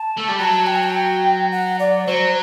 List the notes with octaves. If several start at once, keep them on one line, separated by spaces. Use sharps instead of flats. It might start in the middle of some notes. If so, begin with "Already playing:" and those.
Already playing: A5
A3
G3
F#3 A5
G5
A5
G5
F#5
D5
F#3 C5